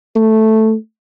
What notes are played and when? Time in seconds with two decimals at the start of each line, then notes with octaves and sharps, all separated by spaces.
0.16 A3